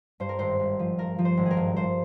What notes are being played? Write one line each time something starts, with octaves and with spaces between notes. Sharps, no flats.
G2 C5
A#4
G#1 C5
G#1
F3
G2 A#4
F3
C5
G#1
G#4
A#4
G2
G2 C5